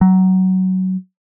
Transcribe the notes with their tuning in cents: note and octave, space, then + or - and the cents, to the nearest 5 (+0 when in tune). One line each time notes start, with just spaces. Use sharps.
F#3 +15